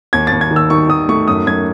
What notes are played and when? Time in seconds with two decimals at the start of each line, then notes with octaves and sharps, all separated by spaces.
0.13 D#2 G#6
0.27 A6
0.32 D#2
0.41 G#6
0.51 D#3
0.56 E6
0.70 D#3 C#6
0.89 D#3 D#6
1.09 A3 C#6
1.28 F#2 D#6
1.46 F#2 G#6